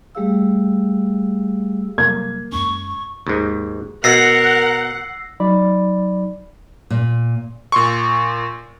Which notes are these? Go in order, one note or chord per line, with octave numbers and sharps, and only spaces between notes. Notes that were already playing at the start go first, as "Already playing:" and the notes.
G3 A3 G4 G#4 F5 E6
C3 F#3 G3 A#3 G#6
F#2 G#3 C#4 C#6
D#2 G#2
B2 A#4 F#5 E6 A#6 C7
F#3 D#4 D5 B5
A#2
A#2 C6 C#6